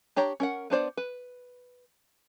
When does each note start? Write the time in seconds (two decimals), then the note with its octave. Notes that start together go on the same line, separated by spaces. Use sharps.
0.16 D4 G4 C#5 A#5
0.40 C#4 A#4 F#5
0.70 B3 D4 C5 D5
0.97 B4